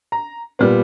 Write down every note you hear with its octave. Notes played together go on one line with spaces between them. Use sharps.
A#5
A#2 G3 B3